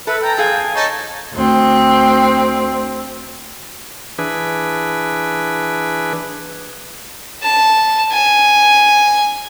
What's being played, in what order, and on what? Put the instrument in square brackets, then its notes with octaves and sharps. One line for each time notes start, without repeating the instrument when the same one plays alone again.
[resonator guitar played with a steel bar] A4 [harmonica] B4 [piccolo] E5
[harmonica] G5 A5 [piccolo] A#5
[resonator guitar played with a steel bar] F2 G#4 F5 [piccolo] G#5
[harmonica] D#4 A4 C#5
[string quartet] D2 C4
[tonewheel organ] E3 D4 G#4 B4
[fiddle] A5
G#5